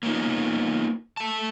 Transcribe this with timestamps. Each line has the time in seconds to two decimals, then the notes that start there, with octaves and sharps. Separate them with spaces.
0.03 A#3 B3 C#4 D#4 F4
1.17 A3 A5